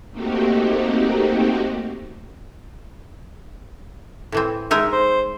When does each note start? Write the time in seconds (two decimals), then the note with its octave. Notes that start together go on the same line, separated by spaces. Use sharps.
0.11 A3 A#3 C4 D#4 F#4 G4
4.32 A2 E3 C4
4.71 G#3 D#4 A#4 E5
4.92 C5